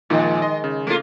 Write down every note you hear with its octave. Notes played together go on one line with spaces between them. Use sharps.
A#2 D#3 F3 G#3 D#4
D#5 C6
C#3
A3 A#3 F4